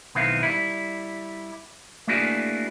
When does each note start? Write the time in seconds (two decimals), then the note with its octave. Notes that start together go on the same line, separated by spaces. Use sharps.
0.15 B1 D#3 B3 C4 E4 F5
0.43 G3 E4
2.08 A3 A#3 D4 E4 F#4 G#4